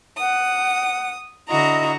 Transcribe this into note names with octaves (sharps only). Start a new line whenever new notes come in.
F#5 D#6
D3 E4 F#4 D#5 A#5 D#6